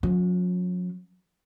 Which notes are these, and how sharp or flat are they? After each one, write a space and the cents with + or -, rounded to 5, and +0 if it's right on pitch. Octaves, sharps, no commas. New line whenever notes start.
F#3 -45 C#4 +0